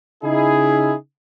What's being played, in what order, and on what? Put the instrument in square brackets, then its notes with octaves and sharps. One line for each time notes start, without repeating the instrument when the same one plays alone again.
[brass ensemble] C#3 D#4 E4 G#4